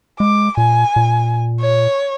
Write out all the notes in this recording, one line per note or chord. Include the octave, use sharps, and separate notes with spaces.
G#3 D6
A#2 G#5
A#2
C#5